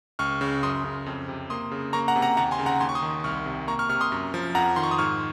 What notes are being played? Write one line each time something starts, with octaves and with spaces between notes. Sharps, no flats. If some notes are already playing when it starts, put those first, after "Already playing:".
C#2 C#6 F6
C#3
F#2 C6 D#6
C#3
F2
C3
A#3 C6 D#6
C#3
A#3 A#5 C#6
F#5 A#5
C3
F#5 A#5
D#2 F#5 A#5
G#5 C6
C#3
F#5 A#5
D#2 G#5 C6
C#6
C6 D#6
D#3
C2 C#6 F6
C3
A#3 A#5 C#6
C#6 F6
C3 C#6 F6
C6 D#6
F#2
F3
F2 F#5 A#5
D#3 C6
C#6
D#6
G#2 C#6 F6